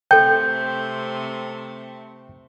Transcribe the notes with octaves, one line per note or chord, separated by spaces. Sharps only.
C3 A3 C4 A4 G5 G6